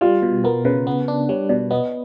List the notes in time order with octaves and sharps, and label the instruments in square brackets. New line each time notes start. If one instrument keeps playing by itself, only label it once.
[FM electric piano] G3 [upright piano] F4
[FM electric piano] B2
[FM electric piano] B3 [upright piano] A#4
[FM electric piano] C#3 [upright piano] B4
[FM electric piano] B3
D4
[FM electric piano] G3 [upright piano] C#5
[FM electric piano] B2 [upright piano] D5
[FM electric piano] B3 [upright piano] D#5